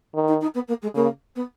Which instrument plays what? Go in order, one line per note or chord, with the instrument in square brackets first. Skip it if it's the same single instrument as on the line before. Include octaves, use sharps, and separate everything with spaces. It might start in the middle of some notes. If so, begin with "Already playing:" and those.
[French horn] D#3
[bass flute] D#4
D#4
B3
A#3
G#3
[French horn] C#3 [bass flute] A#3
[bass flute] B3